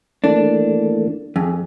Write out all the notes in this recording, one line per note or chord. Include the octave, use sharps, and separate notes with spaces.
E3 A3 A#3 D4
F2 G#4